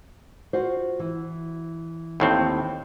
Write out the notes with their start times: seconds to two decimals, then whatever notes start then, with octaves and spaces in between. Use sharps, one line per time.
0.53 F4 F#4 C5
0.99 E3
2.20 D#2 A2 C4